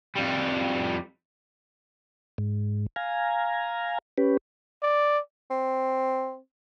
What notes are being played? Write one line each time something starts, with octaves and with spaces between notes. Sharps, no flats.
F2 G3
G#2
F5 G#5 A#5
C#4 G4 B4
D5
C4